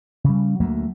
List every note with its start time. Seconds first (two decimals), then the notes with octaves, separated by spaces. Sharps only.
0.24 C#3 G3
0.60 D2 F#3 A3 A#3